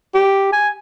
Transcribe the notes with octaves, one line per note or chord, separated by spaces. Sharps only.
G4
G#5